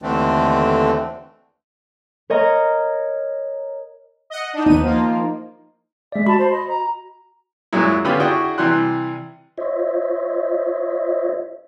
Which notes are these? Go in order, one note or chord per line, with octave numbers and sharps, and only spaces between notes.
D#2 D3 E3 A3 C4 D4
A#4 C#5 D#5 A#5
D#5 F#5
D4 D#4
D#2 B3 D#4 D#7
F3 A#3 F4
G#3 D5 E5
F#4 A5 B5
C5
D#5
A#5
F#2 A#2 F#3 G#3 E4
D3 B3 C#4 F4 G4 B5
D4 E4 F#4 G#4 G5 C#6
C3 E3 G3 C6 F#6
F4 C5 C#5 D#5 E5